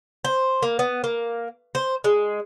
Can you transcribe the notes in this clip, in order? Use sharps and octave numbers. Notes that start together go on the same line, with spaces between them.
C5
A#3
B3
A#3
C5
G#3